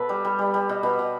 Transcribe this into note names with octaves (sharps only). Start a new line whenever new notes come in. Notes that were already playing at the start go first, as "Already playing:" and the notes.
Already playing: B2 A4 B4
G3
G3
G3
G3
B2
B2 B4
B2